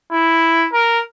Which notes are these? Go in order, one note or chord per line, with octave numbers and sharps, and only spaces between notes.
E4
A#4